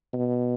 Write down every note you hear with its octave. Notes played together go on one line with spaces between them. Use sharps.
B2